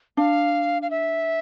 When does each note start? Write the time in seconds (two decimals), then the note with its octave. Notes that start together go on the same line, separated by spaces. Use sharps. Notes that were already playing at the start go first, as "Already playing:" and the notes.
0.17 D4 F5
0.82 F5
0.91 E5